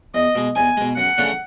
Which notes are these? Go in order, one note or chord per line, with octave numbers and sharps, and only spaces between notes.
E2 D#5
B2 G#3
E2 G#5
B2 G#3
F#2 F#5
C#3 E3 A3 D4